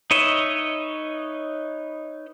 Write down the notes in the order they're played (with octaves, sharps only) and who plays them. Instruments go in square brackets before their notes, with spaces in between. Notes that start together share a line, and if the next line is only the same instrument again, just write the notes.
[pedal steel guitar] D#4 B4 C#5 D#5 E5